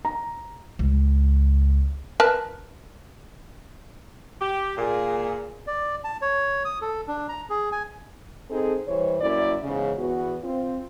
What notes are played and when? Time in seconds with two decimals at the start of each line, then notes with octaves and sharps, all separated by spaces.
0.05 A#5
0.79 C#2
2.20 A#4 B4 A5
4.41 G4
4.77 A#2 G#4
5.67 D5
6.04 A5
6.22 C#5
6.65 D#6
6.82 A4
7.08 D4
7.29 A#5
7.50 G#4
7.72 G#5
8.50 C4 D#4 G#4 A4
8.88 E3 G3 C5 C#5
9.21 F#2 A#3 E4 D5
9.64 E2 G#2 C#3
9.98 E2 E3 B3 F#4
10.42 C4 F4